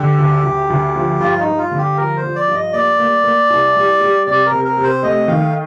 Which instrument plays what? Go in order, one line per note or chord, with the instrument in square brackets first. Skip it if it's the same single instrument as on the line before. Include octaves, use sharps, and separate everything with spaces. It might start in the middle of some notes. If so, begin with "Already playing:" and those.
Already playing: [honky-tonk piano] D3 [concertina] G4
[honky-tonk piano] D2
D2
D2
F3
[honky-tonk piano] G2 [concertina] F4
[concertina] D#4
[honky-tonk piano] G2
[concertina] F4
[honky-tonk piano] D3
[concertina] G4
[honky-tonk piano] F3 [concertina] A#4
[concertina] C5
[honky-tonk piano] F3
[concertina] D5
[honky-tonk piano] G2
[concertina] D#5
[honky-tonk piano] A#3 [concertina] D5
[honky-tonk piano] A#3
A#3
C2
G3
G3
[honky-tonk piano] C3 [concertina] D5
[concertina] A#4
[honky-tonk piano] C3
[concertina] A#4
[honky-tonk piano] C3
[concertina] C5
[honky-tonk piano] A3 [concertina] D#5
[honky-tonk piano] D#3 [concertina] F5